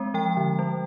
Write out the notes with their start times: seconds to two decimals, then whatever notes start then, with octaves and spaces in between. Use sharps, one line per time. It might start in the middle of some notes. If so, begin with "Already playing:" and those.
Already playing: G#3 C4
0.14 F3 G5
0.37 D3
0.59 G3